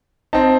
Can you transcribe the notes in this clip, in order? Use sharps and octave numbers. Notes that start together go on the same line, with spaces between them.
C4 D#4 A5